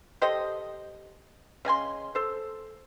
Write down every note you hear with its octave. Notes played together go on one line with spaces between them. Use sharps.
G4 A4 C5 D#5
C#3 D#5 G#5 C6
A4 C5